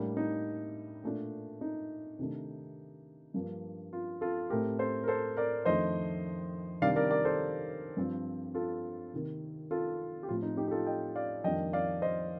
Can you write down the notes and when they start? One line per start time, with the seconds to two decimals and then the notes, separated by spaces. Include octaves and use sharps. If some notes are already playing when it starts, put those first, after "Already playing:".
Already playing: A2 G3 A#3 D4
0.17 D#4
1.03 A#2 A3 D4
1.61 D#4
2.19 C3 D#3 A3 D4
3.34 G2 F3 A#3 D4
3.93 F4
4.21 F4 A4
4.50 A2 A3 C4 G4 A#4
4.79 A4 C5
5.04 A#4
5.08 A4 C5
5.37 A#4 D5
5.65 F2 D#3 A3 D4 C5 D#5
6.82 C3 D#3 G3 D4 D5 F5
6.96 A#4 D5
7.10 A#4 D5
7.25 A4 C5
7.97 G2 F3 C4
8.55 F4 A4
9.14 C3 D#3 A#3
9.71 F4 A4
10.23 G4
10.28 A2 F3 C4 F4
10.42 D#4
10.57 D#4 G4
10.68 G4
10.71 F4 A4
10.86 D#5 G5
11.16 D5 F5
11.44 F2 D#3 G3 A#3 D4 D#5 G5
11.73 D5 F5
12.02 C5 D#5